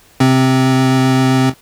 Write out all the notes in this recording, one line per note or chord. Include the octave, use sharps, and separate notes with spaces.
C3 C4